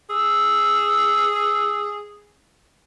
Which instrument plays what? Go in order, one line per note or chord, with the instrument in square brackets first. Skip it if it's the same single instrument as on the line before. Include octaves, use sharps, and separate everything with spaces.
[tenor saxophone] G#4 [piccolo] E6